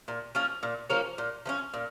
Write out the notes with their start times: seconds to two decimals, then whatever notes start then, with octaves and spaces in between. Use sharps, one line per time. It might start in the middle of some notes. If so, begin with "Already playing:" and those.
0.08 A#2
0.35 F3 A#3 C#4
0.63 A#2
0.90 F3 A#3 C#4
1.18 A#2
1.46 F3 A#3 C#4
1.74 A#2